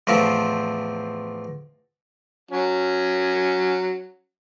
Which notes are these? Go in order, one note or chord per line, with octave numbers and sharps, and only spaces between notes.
E2 A2 F3 A3 C4
F#3 C#4